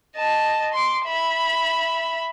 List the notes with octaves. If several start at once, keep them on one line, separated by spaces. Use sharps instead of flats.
D#5 A5
C6 D6
E5 B5